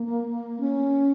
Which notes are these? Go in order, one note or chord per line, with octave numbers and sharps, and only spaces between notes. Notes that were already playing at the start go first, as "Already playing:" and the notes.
Already playing: A#3
C#4